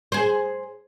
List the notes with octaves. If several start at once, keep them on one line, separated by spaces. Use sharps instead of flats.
G#4 C5